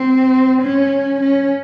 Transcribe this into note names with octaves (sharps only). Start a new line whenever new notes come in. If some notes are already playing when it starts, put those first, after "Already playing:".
Already playing: C4
C#4
C#4